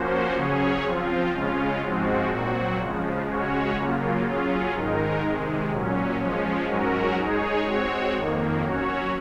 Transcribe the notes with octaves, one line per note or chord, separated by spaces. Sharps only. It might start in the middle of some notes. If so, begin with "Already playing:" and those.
Already playing: F3 A#3 C#4 F#4 C5
C#3 F#3 C#4 G#4 C#5
F3 C4 F4
C#3 G#3 C#4 F4
G#2 F3 G#3 C4 F#4
A#2 F#3 C4 F#4
C#3 F3 G#3
C#3 G#3 C#4 F#4 C#5
C#3 F#3 A#3 F4
F#3 C#4 F4 G#4
G#2 D#3 G#3 D#4 A#4
C3 D#3 G#3
A#2 F#3 C#4
F3 G#3 C#4
G#2 F#3 C#4 F#4 A#4
G#3 D#4 G#4 C#5
G#3 C4 F#4 C#5
F2 D#3 A#3
F#3 C#4 F#4 C#5